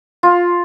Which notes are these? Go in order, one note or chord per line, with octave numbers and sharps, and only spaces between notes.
F4